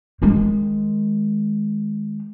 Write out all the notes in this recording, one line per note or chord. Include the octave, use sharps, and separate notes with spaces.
D#3 G#3